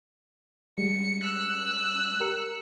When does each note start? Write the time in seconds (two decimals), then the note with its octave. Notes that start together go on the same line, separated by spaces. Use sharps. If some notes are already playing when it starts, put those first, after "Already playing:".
0.78 G3 G#3 C#7
1.23 E6 F#6
2.20 G4 A#4 C#7